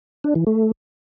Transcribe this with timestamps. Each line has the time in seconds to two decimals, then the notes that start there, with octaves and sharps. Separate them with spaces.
0.24 D4
0.35 E3
0.47 A3